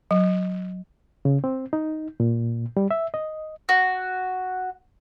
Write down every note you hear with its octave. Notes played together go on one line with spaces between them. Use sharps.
F#3
C#3
C4
D#4
A#2
G3
E5
D#5
F#4